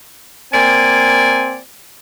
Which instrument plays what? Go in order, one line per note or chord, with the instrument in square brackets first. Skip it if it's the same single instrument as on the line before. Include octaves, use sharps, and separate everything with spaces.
[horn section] A#3 C4 D5 G#5